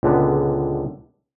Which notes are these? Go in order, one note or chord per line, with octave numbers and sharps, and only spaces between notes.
C#2 A#2 D3 G#3 B3